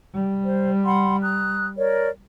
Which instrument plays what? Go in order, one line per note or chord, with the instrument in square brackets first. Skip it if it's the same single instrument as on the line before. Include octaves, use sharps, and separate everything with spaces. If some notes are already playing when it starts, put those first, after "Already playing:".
[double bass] G3
[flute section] C5
F#5 B5 C6
A#5 D#6 F#6
A#4 C#5 D5